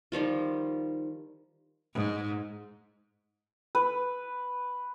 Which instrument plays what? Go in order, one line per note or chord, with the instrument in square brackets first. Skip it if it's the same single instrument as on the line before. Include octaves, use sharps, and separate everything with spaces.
[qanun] D#3 F3 G3 F4
[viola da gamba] G#2
[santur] B4